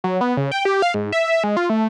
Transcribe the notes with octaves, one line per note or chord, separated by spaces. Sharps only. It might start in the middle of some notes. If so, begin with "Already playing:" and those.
F#3
B3
C#3
G5
G4
F5
G#2
E5
G#3
F4
A3